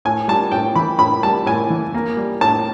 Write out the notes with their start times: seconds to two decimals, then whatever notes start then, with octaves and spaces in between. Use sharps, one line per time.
0.05 A2 G#5
0.28 G3 A5
0.52 A2 G5
0.75 E3 B5
0.99 A2 B5
1.23 G3 A5
1.46 A2 G#5
1.70 E3
1.94 A#3
2.17 G3
2.41 A2 A5